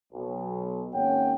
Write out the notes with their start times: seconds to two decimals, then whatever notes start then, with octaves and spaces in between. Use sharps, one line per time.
0.13 B1
0.93 G#1 A#3 C#4 C#5 F#5 G5